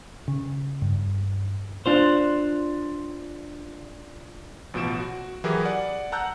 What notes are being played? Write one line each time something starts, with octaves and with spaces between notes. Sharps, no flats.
C#3
G2
D4 F4 C5
A1 B2 F3 D7 E7
F#4
E3 F#3 E4 G4 G#4 A#4
D5 F#5 G#5
F#5 A5 A#5 E6 F#6 G6